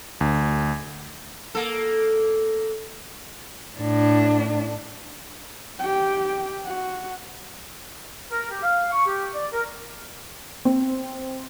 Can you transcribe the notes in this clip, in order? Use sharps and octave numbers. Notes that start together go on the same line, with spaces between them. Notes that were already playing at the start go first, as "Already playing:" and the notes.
D2
A#3 A4
A2 D4
G4 G5
F#4
A#4
G4
F5
C#6
G4
D5
A#4
C4